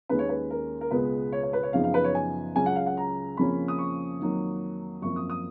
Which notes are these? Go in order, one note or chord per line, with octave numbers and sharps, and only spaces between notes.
D#2 D#3 G#3 C#4 B4
C#5
B4
A#4
A#4
C#2 B2 G#3 B3 B4
C#5
C#5
B4
C#5
F#2 C#3 F3 B3 D#4 F5
F5
B4
C#5
G#5
C#2 C#3 F#3 C#4 G#5
F#5
F5
F#5
A#5
F2 C#3 F3 A#3 C#4 B5
D#6
C#6
F2 D#3 F#3 A#3
G#1 F#2 F3 A#3 C#6
D#6
D#6